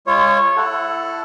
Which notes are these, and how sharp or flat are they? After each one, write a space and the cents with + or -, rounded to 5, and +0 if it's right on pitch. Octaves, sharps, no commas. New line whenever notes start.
G#3 -40 F4 -35 C#5 -15
E4 +20 A4 +0 F#5 +0